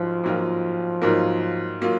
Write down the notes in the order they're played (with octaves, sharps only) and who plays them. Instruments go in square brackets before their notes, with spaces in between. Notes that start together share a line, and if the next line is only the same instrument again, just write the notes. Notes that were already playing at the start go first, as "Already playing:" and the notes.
Already playing: [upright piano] G#2 F#3 [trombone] F3
[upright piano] G#2 F#3 A#3 F4 A#4
G#2 F#3 A#3 F4 A#4
F#3 A#3 F4